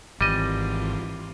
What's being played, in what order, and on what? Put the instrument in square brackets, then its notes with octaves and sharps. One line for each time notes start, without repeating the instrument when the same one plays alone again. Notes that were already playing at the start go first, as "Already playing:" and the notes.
[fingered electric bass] G#1 [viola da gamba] E3 C4 F4 [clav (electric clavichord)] G3 D#5